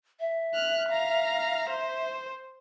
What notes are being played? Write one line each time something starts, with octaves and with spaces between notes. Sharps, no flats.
E5
F6 F#6
F5 A#5
C5